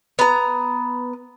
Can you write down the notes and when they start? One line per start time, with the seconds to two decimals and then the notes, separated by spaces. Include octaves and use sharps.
0.19 B3 A#5